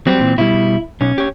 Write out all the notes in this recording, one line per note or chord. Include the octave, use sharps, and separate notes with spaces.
F#3 G3 C4
A#2 E3
B2 G3 E4
B1 C#4
G4 C#5